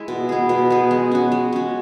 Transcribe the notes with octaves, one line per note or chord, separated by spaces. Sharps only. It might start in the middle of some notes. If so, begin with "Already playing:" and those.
Already playing: G#3 E4
B2
B3 G#4
B2
B3 G#4
G#3
C#4 F#4
G#3
C#4 F#4